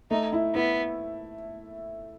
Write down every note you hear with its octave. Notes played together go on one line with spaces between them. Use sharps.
A3 D#4
E4
B3 E4